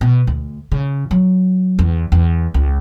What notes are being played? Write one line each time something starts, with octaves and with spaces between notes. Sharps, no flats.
B2
D2
C#3
F#3
E2
E2
C#2